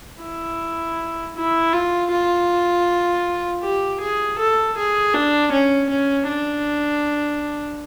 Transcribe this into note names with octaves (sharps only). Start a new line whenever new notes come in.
E4
E4
F4
F4
G4
G#4
A4
G#4
D4
C#4
C#4
D4